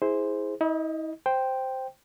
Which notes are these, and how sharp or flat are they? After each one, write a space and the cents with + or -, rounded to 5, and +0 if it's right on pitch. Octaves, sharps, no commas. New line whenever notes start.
E4 -25 G#4 +0 C5 +0
E4 -45 D#5 +0
C5 +0 G5 +0